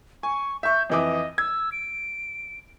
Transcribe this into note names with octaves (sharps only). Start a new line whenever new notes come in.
G#5 C#6
E5 C#6 G6
F2 E3 D#5 D6
E6 G#6
D7